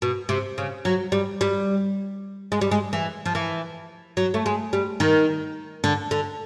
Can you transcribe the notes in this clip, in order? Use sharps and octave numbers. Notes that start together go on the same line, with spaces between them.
B2
C3
C#3
F#3
G3
G3
G#3
G3
G#3
E3
F3
E3
F#3
A3
G#3
G3
D#3
D3
D3